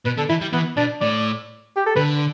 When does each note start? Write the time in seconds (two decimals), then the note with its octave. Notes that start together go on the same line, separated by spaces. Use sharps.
0.06 B2 B4
0.18 D3 A4
0.29 E3 E4
0.41 G3
0.53 E3 B3
0.77 B2 D4
1.01 A2 D5
1.76 G4
1.86 A4
1.96 D3 B4